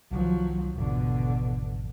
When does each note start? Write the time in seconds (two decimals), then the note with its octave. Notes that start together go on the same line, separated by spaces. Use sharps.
0.11 C2 C3 D#3 F3 F#3
0.75 G#1 E2 B2 D3